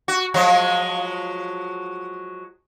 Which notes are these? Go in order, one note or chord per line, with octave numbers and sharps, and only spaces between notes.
F#4
F3 F#3 G#3